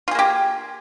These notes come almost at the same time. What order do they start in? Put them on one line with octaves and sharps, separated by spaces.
F4 G#4 A#3 G4